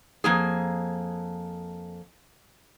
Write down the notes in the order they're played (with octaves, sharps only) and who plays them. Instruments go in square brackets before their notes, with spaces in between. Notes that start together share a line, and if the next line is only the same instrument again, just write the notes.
[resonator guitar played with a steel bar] F2 A#3 G#4